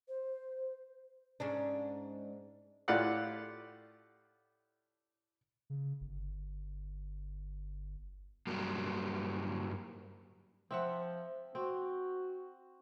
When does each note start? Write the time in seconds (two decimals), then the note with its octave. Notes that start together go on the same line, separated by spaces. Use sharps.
0.08 C5
1.40 G#2 C#4 D4
2.88 A2 F4 G4 D5 F#5 F#6
5.70 C#3
6.01 G1
8.47 G2 F#3 G3 A#3
10.71 F3 C4 E5 F#5
11.55 C4 F#4